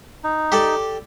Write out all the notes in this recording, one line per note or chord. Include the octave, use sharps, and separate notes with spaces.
D#4
G4 A4 D5